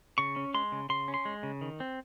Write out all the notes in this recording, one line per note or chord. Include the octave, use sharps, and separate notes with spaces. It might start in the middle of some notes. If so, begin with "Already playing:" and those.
C#3 C#6
C#4
G#3 C6
C#3
C#3 C6
C#4
C6
G#3
C#3
D#3
C4